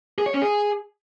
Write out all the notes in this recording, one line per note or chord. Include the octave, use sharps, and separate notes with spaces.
G#4
C#5
C#4
G#4